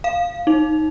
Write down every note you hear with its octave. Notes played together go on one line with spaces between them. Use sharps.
F5
D#4